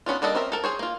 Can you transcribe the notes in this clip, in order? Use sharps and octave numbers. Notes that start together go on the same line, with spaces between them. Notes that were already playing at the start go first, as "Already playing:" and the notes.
B3 C#4 D4 F4
G3 A#3 D4 A4 D#5
C4 C#4 A#4 E5
A4 A#4 A5
G#4 C5 C#5
A#3 F4